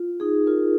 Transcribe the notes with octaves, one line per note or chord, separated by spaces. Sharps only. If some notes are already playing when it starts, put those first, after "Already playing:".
Already playing: F4
D#4 G#4
F4 A#4